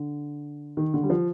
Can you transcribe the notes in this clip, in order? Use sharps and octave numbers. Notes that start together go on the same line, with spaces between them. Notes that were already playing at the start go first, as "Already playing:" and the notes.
Already playing: D3
D#3
D3
G3
F3